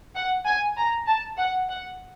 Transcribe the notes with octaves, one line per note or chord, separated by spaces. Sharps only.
F#5
G#5
A#5
A5
F#5
F#5